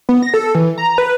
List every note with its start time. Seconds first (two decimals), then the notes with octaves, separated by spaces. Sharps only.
0.09 B3
0.23 A#6
0.34 A4
0.55 E3
0.78 A#5
0.98 B4